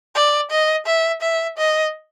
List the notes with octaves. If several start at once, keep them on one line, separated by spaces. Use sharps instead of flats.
D5
D#5
E5
E5
D#5